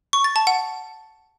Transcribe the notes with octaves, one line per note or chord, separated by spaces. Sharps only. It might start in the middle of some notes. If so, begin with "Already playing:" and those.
C#6
A6
A5
F#5